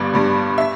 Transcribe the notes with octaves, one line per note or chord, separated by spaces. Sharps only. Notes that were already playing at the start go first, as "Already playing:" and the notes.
Already playing: G1 G2 G3 D5
G1 G2 G3
E5